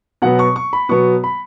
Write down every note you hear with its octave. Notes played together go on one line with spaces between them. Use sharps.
B2 F#3 B3 F#5
C#6
C#6
B5
B2 F#3 B3 C#6
B5